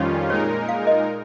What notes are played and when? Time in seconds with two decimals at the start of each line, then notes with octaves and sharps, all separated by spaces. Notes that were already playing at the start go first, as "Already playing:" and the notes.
Already playing: F2 D#3 G3 C#4 F4 C#5
0.29 A#2 G#3 D#4 A#4 C#5
0.69 F5
0.87 D#5